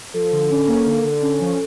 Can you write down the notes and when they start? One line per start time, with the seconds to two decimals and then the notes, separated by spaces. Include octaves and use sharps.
0.14 F3 A4
0.32 D3
0.50 C#4
0.67 A#3
0.85 D3
1.03 D3
1.22 C#4
1.40 F3